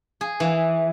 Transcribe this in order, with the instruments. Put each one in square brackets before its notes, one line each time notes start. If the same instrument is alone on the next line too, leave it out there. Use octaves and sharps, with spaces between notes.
[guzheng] G#4
E3